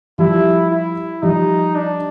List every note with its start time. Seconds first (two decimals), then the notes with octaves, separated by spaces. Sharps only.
0.19 F3 G3 E4
0.71 E4
1.22 F3 G3 D#4
1.75 D4